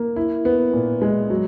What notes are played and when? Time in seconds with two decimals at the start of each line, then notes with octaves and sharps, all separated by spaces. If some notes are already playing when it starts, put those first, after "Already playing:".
Already playing: A#3
0.16 E4
0.45 B3
0.73 A#2
1.02 G#3
1.30 F#3